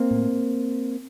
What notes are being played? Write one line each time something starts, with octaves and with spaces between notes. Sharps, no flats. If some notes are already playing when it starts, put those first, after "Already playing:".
Already playing: A#3 C4
A2